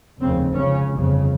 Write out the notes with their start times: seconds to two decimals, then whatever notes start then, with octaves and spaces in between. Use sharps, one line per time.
0.20 F1 D#2 C#3 C4
0.56 C#2 C#3 C#4
0.93 G1 F2 C#3